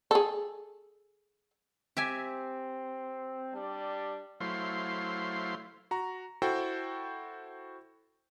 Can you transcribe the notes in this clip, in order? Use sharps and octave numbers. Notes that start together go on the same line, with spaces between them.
G#4 A4
C4 G4 E5 G#5
G3 D4 D5
F#3 A3 E4 C5 F5 C6
F#4 A#5
E4 F#4 A4 C5 G5